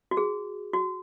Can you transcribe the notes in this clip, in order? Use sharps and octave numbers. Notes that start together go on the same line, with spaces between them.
F#4
G#4
F#4